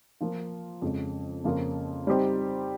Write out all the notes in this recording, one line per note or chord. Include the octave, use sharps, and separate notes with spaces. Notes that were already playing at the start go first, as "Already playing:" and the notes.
F3 A#3 F4
F2 C#3 G#3
F2 C#3 F3 A#3 F4
G3 C4 D#4 G4 C5